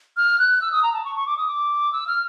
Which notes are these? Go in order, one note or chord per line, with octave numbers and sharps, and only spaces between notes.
F6
F#6
E6
D#6
A#5
A5
C#6
C#6
D6
D#6
D6
E6
F6